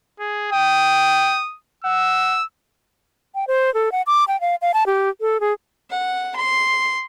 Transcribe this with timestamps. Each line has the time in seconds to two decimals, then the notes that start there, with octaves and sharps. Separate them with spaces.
0.20 G#4
0.52 G5 D#6
1.84 F#5 E6
3.35 G5
3.48 C5
3.74 A4
3.92 F#5
4.07 D6
4.28 G5
4.41 F5
4.62 F5
4.74 A5
4.87 G4
5.21 A4
5.40 G#4
5.91 F#5
6.36 C6